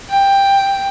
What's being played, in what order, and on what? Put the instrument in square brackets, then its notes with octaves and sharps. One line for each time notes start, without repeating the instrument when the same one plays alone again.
[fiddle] G5